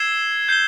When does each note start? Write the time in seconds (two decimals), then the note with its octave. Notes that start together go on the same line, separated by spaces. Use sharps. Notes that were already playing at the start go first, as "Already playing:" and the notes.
Already playing: E6 G#6 C7 E7 G7
0.49 G6 C7 G7